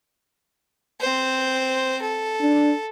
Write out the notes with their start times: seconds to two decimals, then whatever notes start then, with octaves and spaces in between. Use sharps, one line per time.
1.01 C4 C5
2.02 A4
2.42 D4